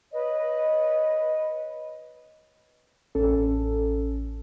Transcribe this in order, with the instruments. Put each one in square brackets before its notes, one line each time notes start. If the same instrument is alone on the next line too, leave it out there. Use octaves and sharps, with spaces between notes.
[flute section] B4 C#5 D#5
[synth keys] A1 C#4 A4